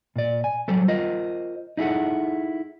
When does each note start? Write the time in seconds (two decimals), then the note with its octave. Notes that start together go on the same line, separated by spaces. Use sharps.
0.16 A#2 D5
0.44 G#5
0.68 F#3 G3 A4 C5
0.88 F4 A#4 C5 D#5
1.77 D#4 E4 G#4 A4 F#5